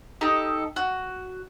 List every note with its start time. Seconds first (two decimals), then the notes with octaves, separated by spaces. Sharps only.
0.21 D#4 G4 A4
0.76 F#4